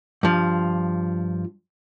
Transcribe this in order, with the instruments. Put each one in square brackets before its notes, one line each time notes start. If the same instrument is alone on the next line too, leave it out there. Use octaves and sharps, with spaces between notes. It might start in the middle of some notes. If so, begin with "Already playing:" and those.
[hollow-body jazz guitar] G2 F3